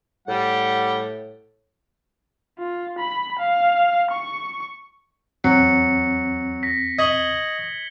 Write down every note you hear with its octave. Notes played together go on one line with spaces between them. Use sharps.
A2 G3 F#5
F4
B5
F5
C#6
E2 F#3 C4 C#7
A#6 B6
D#5 C#6 G#6 F#7 G7